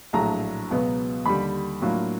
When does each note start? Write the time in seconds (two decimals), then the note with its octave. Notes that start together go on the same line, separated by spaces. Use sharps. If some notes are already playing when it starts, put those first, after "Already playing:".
0.13 A#1 A2 F#3 A3 D4 A#5
0.70 C#2 B2 F#3 B3
1.26 D#2 D3 G3 B5
1.82 A2 F#3 A#3 D4 F4